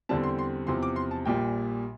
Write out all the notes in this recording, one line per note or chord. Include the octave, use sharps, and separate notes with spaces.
E2 D3 G3 C4 A5
C6
C6
E2 C3 F3 C6
D6
C6
A5
A#1 A#2 G3 G5